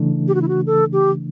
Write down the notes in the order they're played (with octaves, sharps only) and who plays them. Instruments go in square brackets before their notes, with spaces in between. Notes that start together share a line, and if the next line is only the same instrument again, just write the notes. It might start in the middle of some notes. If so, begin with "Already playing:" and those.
Already playing: [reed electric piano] C#3 E3 A3 D4
[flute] G4
F#4
E4
F#4
A4
G4